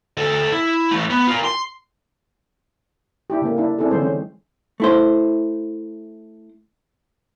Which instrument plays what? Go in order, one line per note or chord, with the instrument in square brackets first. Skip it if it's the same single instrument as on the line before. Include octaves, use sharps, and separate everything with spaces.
[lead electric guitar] D2 A4
E4
E3 A3
B3
F4 A#4
C6
[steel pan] D4 E4 G4
C#3 A3 A#3
D4 E4
C4 D4 E4 G#4 A4
D3 E3 F#3 G#3 A4 C5
G#3 C#4
[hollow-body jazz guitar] A3 E4 C5